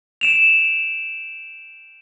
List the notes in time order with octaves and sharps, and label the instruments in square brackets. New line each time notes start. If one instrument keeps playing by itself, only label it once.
[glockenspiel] D7 E7 F7